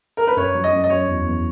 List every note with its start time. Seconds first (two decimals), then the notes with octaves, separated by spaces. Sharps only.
0.17 A#4
0.27 B4
0.37 F#2 C#5
0.55 F#3
0.64 D#5
0.73 F#2
0.84 D#5
0.90 F#3 C#5
1.08 E2
1.26 E2